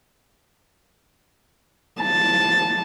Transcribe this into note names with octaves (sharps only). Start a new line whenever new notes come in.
A5